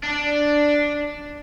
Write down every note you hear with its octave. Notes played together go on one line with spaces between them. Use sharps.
D4